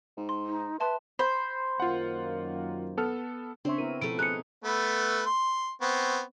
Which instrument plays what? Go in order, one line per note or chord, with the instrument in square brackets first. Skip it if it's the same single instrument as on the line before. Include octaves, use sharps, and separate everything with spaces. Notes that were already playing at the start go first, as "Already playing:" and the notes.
[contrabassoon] G#2
[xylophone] C6
[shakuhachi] D#4
[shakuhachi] B4 [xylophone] E5 A5 C6
[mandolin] C5 [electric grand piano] B5
[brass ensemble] F#2 D#3 A#3 [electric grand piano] F4 F#5
[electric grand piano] B3 A4 F6
[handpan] C#3 C#5 E5 [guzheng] C4 [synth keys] D4 C6
[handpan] B3 E4 A#4 [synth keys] D#7
[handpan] B2 F3 [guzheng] A3 E4 [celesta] D7
[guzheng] D#4 [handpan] G#4 [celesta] F#6 C#7
[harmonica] A3 B3 B4
C6
B3 C4 C#6